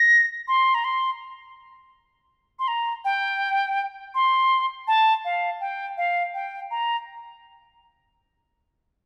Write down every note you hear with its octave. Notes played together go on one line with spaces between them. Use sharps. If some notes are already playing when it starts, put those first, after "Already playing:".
Already playing: A#6
C6
A#5
C6
C6
A#5
G5
C6
A5
F5
G5
F5
G5
A#5